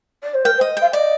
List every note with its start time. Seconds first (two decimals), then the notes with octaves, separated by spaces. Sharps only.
0.23 D5
0.34 C5
0.44 A#4 G5
0.57 C5
0.61 D#5
0.77 F5 G5
0.93 D5 D#5